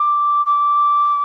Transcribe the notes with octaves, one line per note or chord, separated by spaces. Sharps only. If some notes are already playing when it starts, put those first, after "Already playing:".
Already playing: D6
D6